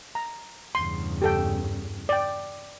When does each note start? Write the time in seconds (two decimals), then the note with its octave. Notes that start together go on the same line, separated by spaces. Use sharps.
0.15 A#5
0.75 E2 G2 C#3 C6
1.22 G4 A4 G5
2.09 D5 G5